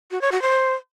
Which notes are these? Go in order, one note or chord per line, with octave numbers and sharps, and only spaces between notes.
F#4
C#5
F#4
C5